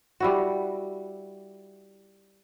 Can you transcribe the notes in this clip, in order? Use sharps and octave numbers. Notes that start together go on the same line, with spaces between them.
G3 E4 F#4